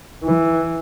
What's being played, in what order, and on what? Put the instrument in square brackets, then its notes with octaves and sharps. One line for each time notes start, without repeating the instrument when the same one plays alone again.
[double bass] E3